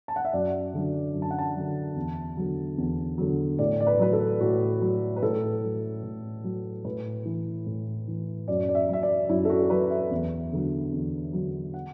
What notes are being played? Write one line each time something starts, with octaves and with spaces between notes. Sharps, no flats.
A5
F#5
E5
F#2 D5
D3 F#3
F#2
A5
F#5
A5
D3 F#3
E2
D3 F#3
E2
D3 F#3
A2 D5
D5
B4
F#3 B4
A4
A2 F#4
F#3
B4
A2 A4
F#3
A2
F#3
A2 B4
E3
A2
E3
F#2 D5
D5
E5
F#3 E5
D5
F#2 E4
A4
F#4
A4
F#3 B4
E5
E2
D3 F#3
E2
D3 F#3
F#5